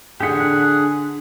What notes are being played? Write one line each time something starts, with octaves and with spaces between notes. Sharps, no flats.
A1 D3 D4 G4 G#4 F#5 B6
D3 F#6